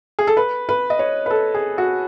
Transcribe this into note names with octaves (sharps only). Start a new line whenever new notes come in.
G#4
A4
B4
B4
D#5
C#5
B4
A4
G#4
F#4